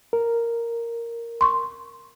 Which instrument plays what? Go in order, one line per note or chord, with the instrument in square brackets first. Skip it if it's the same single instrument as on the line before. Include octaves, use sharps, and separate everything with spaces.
[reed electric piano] A#4
[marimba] C6 C#6